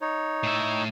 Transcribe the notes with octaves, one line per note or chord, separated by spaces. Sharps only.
D#4 C#5
A2 E5